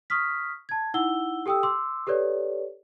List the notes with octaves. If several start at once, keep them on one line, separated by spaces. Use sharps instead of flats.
C#6 D#6 F6 B6
A5 G#6
D#4 E4 F#5 E6 G7
G4 A4 G5 D#6 E6
C6 D6 E6
G4 A4 B4 C#5 D5